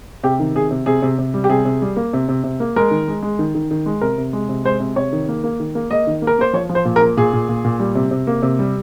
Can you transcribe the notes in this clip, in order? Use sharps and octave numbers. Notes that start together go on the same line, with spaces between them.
C3 G4
D#3
C3 G#4
C3
C3 G#4
C3
C3
G3
G4
C3 G#4
C3
G3
A#3
C3
C3
C3
A#3
G#3 A#4
D#3
G#3
G#3
D#3
D#3
D#3
G#3
C3 A#4
C3
G#3
C3
G#3 C5
C3
C3 C#5
D#3
A#3
A#3
D#3
A#3
A#3 D#5
D#3
A#3
A#4
A#3 C5
F3 C#5
F3
C5
A#2
A#4
A#3
A#2 G#4
A#2
A#2
A#2
G3
C3
C3
A#3
C3
G3